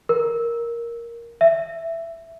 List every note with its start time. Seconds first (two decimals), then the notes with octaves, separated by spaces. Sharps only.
0.09 A#4
1.41 E5